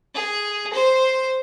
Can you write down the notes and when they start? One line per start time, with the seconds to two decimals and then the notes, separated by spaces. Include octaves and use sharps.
0.15 G#4
0.73 C5